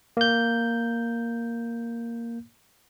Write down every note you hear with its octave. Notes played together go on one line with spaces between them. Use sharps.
A#3 G6